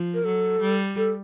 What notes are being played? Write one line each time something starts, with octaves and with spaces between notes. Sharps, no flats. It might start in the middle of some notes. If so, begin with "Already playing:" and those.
Already playing: F3
A#4
F#3 A4
G3
A4